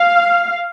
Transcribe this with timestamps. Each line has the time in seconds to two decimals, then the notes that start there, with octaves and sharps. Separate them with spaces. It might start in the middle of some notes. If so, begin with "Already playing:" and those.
Already playing: F5